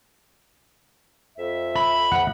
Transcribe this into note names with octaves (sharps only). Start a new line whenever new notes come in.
F2 E5
B5
F#5